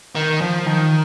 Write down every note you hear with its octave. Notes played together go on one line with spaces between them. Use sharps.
D#3
F3
D#3